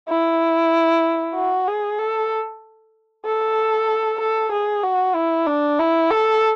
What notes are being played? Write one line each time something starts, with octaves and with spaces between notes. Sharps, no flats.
E4
F#4
G#4
A4
A4
A4
G#4
F#4
E4
D4
E4
A4